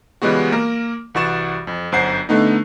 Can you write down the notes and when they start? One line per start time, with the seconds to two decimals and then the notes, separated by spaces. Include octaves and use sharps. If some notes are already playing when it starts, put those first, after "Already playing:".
0.22 C#3 E3 G3 G#3 B3 F#4
0.52 A#3 A#4
1.14 C2 E3 F#4 C#6 A6 E7
1.67 F2
1.92 G1 F#2 C5 F#5 C7
2.29 D3 A3 B3 D#4